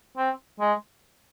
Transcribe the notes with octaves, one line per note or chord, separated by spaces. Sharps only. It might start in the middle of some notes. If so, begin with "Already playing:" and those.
C4
G#3